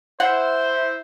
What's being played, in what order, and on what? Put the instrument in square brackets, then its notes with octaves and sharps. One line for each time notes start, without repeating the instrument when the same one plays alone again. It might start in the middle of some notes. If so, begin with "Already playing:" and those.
[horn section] E4 C5 [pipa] F#5